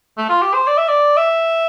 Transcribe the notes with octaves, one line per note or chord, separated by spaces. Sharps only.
A3
F4
G4
C5
D5
E5
D5
E5